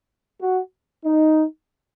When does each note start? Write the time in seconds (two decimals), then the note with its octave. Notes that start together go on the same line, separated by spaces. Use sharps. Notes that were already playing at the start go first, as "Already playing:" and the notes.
0.41 F#4
1.06 D#4